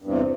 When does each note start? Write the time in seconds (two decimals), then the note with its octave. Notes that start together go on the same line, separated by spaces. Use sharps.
0.02 G2
0.04 E2
0.07 C3